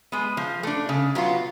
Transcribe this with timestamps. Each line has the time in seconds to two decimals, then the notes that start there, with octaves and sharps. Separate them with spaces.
0.12 G#3 B3
0.37 F3
0.63 A3 D4
0.89 C#3
1.15 F#3 B3 F4